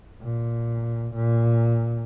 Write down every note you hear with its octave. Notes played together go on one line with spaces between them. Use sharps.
A#2
A#2